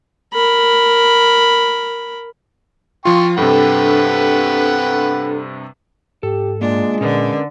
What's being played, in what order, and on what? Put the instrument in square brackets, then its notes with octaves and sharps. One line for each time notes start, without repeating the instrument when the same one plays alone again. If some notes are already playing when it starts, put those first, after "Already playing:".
[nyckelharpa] A#4 B5
[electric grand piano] F3 F4 [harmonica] G5 C6 C#6
[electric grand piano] G2 C3 [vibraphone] D4 A4 [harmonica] B4 F#5 G5
[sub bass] G#2 [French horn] G4 [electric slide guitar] A4
[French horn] G#3 [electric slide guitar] A#3 F4 [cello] D4
[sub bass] A#2 [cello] D3 [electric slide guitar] C#4 A#4 B4